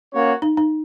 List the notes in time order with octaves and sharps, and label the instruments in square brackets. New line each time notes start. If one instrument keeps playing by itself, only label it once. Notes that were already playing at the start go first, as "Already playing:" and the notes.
[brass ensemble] A#3 C#4 F#4 C#5
[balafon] D#4
D#4